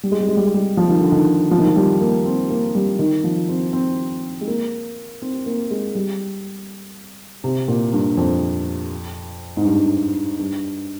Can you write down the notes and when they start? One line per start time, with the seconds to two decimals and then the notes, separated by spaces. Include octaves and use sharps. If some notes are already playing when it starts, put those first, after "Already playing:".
0.03 G3
0.12 G#3
0.20 G3
0.28 G#3
0.37 G3
0.45 G#3
0.54 G3
0.77 F3
0.88 D#3
1.00 D3
1.12 D#3
1.51 F3
1.59 D#3
1.67 F3
1.76 G3
2.01 A#3
2.25 C4
2.50 A#3
2.75 G3
2.99 D#3
3.24 F3
3.49 C4
3.73 C4
4.41 G#3
4.47 A#3
5.22 C4
5.46 A#3
5.70 G#3
5.95 G3
7.44 C3
7.68 A#2
7.93 G2
8.17 F2
9.57 G#2
9.65 G2
10.39 G2